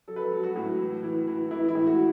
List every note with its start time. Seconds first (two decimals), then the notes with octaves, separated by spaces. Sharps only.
0.08 F#3 A4
0.16 B4
0.25 A4
0.32 F#3
0.43 F#4
0.55 A2
0.79 E3
1.03 E3
1.27 E3
1.51 E3 E4
1.69 E4
1.75 A2
1.87 F#4